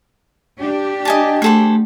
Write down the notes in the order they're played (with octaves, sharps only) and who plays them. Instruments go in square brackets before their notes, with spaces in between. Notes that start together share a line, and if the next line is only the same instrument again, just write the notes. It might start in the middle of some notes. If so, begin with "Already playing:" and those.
[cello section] D4 G4
[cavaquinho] D#5 G#5 A5
[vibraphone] A3 F#5 [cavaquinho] G#4 A4 C5